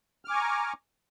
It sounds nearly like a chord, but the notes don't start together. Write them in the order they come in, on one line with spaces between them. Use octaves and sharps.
F6 D6 G#5 C#6 A#5